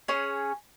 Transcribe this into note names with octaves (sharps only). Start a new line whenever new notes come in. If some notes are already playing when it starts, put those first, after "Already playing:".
C#4 G#4 C#5